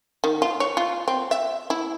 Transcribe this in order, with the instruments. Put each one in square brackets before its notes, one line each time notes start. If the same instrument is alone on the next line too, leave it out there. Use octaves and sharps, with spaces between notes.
[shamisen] D#3
F4
C#5
F4
C4
E5
E4